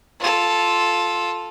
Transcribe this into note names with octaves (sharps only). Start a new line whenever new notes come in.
F4 A4